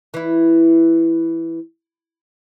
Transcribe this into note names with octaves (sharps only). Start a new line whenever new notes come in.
E3 E4